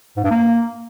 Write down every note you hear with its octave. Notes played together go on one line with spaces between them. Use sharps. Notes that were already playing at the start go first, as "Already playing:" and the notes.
G#2
G2
A#3